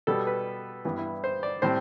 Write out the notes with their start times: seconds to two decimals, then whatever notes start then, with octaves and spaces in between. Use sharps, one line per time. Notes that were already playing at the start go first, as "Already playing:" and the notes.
0.07 B2 G3 B3 A4
0.27 B4
0.85 G2 E3 G3 B3
0.98 E4
1.24 C5
1.43 D5
1.62 A2 G3 C4 C5